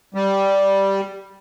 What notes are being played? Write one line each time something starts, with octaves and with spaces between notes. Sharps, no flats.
G3